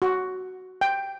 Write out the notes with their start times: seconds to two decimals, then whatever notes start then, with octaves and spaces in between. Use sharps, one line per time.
0.02 F#4
0.81 G5